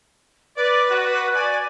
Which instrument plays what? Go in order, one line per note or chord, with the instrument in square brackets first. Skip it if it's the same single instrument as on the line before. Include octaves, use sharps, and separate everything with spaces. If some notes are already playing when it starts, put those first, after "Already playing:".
[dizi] B4 [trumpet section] D5
[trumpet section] F#4
[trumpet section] D5 [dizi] G#5